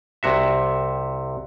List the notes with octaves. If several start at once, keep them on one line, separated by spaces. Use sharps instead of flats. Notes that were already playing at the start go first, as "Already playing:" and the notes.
C2 C3 F#4 E5